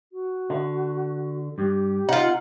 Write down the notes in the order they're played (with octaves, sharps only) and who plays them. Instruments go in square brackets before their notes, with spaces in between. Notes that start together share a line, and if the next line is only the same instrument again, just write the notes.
[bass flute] F#4
[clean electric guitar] D3
[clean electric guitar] G2 [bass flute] G4
[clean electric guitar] C3 D#4 [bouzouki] F4 F#5